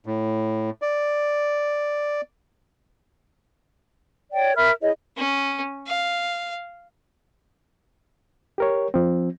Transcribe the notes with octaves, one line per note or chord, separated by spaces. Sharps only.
A2
D5
C#5 D5 G5
A#4 E5 B5 F6
E4 G#4 C#5 D#5
C#4
F5
G4 A#4 C#5
F3 C4